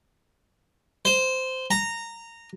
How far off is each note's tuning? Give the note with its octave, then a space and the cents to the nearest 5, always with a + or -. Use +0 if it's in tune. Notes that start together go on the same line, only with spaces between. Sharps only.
C5 -15
A#5 -15